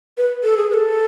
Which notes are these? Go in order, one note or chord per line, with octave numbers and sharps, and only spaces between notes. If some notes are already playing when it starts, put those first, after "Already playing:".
B4
A4
G#4
B4
A4